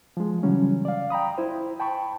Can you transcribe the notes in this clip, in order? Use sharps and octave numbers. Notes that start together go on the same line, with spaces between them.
F3 G#3
C#3 E3 F#3 G3 C#4
D5 F5
G5 A#5 B5 D#6
E4 C5
G5 A5 B5 C#6